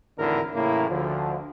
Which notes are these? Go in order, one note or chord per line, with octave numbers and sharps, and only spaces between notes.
G#1 E2 A2 D3 E4 A#4
A2 C#3 E3 A#3 E4
D2 D3 F3